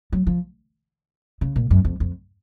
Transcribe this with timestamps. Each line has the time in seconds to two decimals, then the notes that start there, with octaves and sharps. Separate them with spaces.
0.12 F#3
0.27 F3
1.41 C#3
1.56 A#2
1.71 F#2
1.85 F2
2.00 F2